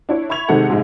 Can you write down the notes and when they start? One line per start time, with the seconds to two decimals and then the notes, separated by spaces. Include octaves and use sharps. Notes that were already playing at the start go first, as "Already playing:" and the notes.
0.09 D4 E4 C#5
0.29 E5 B5 C#6 G#6 F7
0.49 C3 D#3 G#3 A4 F#5
0.69 A#1 G#2 C3 G#3